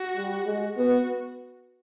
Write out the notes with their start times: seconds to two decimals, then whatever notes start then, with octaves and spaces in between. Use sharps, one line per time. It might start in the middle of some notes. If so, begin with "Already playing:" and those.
Already playing: F#4
0.16 G3
0.46 G#3
0.77 B3 F#4